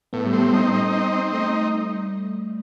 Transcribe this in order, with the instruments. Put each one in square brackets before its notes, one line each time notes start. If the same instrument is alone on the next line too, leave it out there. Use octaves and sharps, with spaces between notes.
[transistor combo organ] A2 [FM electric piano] B3
[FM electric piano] G3
[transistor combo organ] C4
[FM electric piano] G3
[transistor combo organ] D#4
D#4
C4
C4
[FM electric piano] A3 [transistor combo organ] D#4